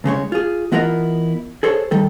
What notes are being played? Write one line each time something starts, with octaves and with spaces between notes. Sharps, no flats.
C2 C#3 G#3 C#5
F4 G#4
E3 B3 E4 F4 A#4 D#5
G#4 A4 C5 C#5
D#3 G3 A4